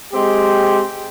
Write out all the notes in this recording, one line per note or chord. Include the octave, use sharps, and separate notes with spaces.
G#3 C4 G4